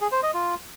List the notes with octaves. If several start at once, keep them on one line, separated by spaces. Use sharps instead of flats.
G#4
C5
D#5
F4